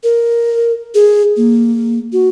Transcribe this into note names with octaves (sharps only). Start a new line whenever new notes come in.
A#4
G#4
A#3
F#4